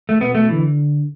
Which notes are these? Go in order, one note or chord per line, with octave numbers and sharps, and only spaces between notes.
A3
B2 B3
A3
D3 E3